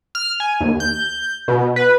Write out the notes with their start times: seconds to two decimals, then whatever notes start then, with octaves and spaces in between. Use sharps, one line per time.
0.15 F6
0.40 G#5
0.61 D#2
0.80 G6
1.48 B2
1.76 B4